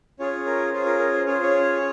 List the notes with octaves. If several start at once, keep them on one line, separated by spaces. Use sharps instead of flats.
C#4 F4 G#4 C#5
A#4
C#4 F4 G#4 C5
A#4
A#4
C5
C#4 F4 G#4 C#5
C5
C#4 C#5